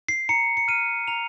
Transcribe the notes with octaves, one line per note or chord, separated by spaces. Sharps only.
C7
A#5 C#7
C#7
F6 D#7
A#5 F7